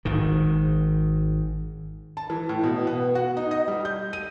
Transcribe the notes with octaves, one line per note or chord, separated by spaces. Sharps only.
G#1 G#2 D#3
A5
E3
A2
B2
B3
F#4
D#4
D#5
G3
G6
D#7